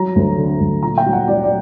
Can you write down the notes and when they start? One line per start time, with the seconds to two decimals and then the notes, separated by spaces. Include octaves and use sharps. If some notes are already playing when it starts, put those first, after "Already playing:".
Already playing: F#3 A#5
0.16 D2
0.38 D3
0.60 D2
0.83 A#2 A#5
0.98 G5
1.06 F#3
1.13 F#5
1.28 F#3 D5
1.44 D5